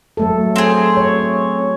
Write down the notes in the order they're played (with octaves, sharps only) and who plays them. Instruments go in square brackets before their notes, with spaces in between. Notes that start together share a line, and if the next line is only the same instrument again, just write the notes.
[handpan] F#3 A3 A4
[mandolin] C4 G#4
[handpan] C#5